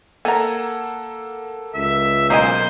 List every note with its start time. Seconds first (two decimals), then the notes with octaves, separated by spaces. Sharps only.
0.25 A#3 A4 F#5 G#5 A#5
1.75 C#2 E5
2.30 B1 A#3 C5 D#5 G#5 D#7